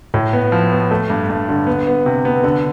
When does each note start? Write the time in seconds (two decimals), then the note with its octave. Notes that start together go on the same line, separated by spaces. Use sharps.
0.14 A2
0.33 B3
0.52 F3
0.72 B3
0.91 A3
1.10 G2
1.29 G2
1.49 D3
1.67 B3
1.87 B3
2.06 C3
2.25 B3
2.43 D3